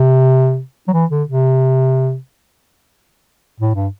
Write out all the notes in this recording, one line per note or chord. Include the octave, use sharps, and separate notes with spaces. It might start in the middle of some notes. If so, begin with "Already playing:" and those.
Already playing: C3
F#3
E3
D3
C3
A2
G2